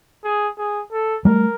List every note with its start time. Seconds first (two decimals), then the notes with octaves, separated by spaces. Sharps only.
0.24 G#4
0.58 G#4
0.92 A4
1.25 G3 A3 A#4